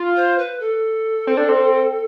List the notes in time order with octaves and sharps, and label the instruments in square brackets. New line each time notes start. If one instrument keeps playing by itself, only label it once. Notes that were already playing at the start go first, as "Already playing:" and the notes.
Already playing: [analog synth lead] F4
[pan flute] C5
B4
A4
[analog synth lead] C4
D4
C4